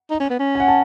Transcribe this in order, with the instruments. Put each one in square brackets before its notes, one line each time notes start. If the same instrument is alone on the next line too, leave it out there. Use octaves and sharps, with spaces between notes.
[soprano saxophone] D#4
C#4
B3
C#4
[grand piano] G#5
F#5
A5